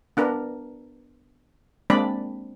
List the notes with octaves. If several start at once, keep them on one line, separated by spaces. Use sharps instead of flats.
B3 D4 A#4
G#3 A#3 C4 D4 D5 B5